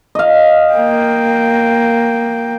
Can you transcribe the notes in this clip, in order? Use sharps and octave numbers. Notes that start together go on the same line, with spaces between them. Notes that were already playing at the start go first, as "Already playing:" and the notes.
D#5 F5
A#3 G5